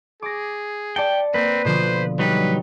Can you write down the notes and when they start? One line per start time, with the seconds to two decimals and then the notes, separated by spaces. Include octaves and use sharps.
0.22 G#4 D6 A#6
0.96 D5 G5 A5 C#7
1.34 A#3 C4 B4
1.65 B2 D3 F3 C5
2.19 F#3 G3 D#4 B4